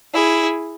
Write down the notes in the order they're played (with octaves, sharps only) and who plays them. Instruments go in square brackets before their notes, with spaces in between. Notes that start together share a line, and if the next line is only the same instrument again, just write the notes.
[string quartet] E4 G#4